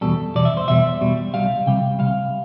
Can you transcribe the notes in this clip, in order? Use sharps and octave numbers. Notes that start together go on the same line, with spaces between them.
E2 B2 G3 A4
E2 B2 G3 D5
E5
C5
E2 B2 G3 E5
E2 B2 G3
C2 C3 G3 F5
C2 C3 G3 G5
C2 C3 G3 F5